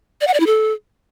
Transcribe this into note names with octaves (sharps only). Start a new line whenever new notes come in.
D5
F#5
D5
E4
A4